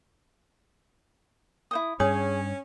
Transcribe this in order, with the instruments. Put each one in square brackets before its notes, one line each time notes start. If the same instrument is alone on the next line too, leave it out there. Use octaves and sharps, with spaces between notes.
[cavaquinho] E4 C5 D#6
[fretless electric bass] G2 [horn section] C#4 [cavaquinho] G#4 [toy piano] C#5 D#6